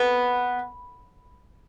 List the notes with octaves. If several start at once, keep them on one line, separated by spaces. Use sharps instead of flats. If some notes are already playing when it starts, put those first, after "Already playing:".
Already playing: B3